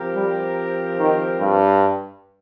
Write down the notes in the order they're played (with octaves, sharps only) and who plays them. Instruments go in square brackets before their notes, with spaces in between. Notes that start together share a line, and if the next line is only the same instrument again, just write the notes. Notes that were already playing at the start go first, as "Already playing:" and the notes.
Already playing: [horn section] F3 C4 G4 A#4
[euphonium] G3
D#3
G2